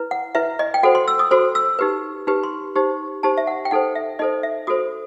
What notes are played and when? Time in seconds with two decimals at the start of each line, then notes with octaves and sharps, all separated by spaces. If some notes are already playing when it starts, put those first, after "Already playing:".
Already playing: E4 B4
0.11 F#5
0.35 E4 B4 E5
0.59 D#5
0.74 G5
0.83 F#4 A4 C5 F#5
0.95 C6
1.08 E6
1.19 D#6
1.31 F#4 A4 C5 C6
1.55 E6
1.79 D#4 G4 B4
2.27 D#4 G4 B4
2.43 C6
2.75 D#4 G4 C5
3.23 D#4 G4 C5 A5
3.38 E5
3.47 F#5
3.65 G5
3.71 D#4 A4 C5 F#5
3.95 E5
4.19 D#4 A4 C5 D#5
4.43 E5
4.67 F#4 A4 C5 D#6